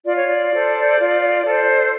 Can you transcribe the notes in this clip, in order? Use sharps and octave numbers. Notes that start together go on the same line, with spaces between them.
F4 D5
C#5
D5
A4 C5
F4
A4 C5